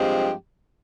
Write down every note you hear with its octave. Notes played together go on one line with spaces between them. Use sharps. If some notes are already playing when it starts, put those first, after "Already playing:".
Already playing: G2 F3 G#3 C4 G4